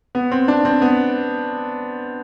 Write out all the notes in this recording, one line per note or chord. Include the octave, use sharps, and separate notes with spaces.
B3
C4
D4
C4
B3